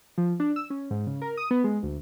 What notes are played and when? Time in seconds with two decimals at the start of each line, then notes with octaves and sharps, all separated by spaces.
0.18 F3
0.40 D4
0.56 E6
0.70 C#4
0.91 G#2
1.07 C#3
1.22 A#4
1.37 D#6
1.51 B3
1.64 G#3
1.83 D2